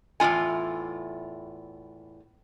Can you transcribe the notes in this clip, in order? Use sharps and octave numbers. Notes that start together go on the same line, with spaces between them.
E2 A2 G3 F4 G#5